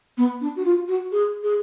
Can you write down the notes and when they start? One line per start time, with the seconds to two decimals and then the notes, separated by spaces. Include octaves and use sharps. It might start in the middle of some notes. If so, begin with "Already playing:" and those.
0.17 B3
0.41 D4
0.56 F#4
0.65 F4
0.88 F#4
1.12 G#4
1.43 G#4